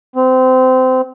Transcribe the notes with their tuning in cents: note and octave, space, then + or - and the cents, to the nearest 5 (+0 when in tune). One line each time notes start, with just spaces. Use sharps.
C4 -25